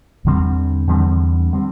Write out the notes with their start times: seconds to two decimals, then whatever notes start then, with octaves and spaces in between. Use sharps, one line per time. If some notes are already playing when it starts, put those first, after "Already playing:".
0.25 E2 D3 G3 C4
0.87 E2 D3 G3 C4
1.52 D3 G3 C4